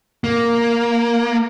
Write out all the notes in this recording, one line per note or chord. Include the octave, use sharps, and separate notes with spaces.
A#3